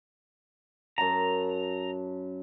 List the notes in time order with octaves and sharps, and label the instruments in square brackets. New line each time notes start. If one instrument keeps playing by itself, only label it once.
[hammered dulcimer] F#2 A5 [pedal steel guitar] A#5